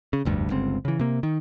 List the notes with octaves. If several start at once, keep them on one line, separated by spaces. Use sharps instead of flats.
C#3
F1 D2 G2
G1 C#2 C4
C#3 E3
C3 A#3
D#3